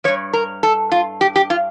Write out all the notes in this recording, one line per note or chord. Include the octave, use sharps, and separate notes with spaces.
G2 F3 C#5
A#4
A4
F4
G4
G4
F4